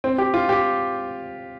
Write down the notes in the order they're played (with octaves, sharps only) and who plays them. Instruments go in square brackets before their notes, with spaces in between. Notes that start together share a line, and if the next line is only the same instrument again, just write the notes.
[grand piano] C4
G4
F4
G4